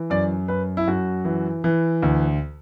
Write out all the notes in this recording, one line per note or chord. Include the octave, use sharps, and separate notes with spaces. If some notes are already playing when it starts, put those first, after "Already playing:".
Already playing: E3
F#2 D5
F#2 B4
E4
F#2 F#4
E3
E3
D2